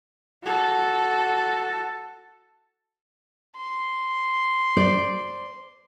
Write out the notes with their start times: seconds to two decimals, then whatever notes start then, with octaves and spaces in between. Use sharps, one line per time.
0.44 F#4 A4
3.57 C6
4.77 C5 D5